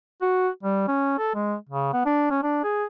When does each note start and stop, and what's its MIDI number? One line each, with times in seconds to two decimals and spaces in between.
0.22 0.48 66
0.63 0.86 55
0.88 1.18 61
1.18 1.34 69
1.35 1.55 56
1.69 1.92 49
1.93 2.01 59
2.06 2.28 62
2.31 2.41 61
2.43 2.62 62
2.64 2.84 68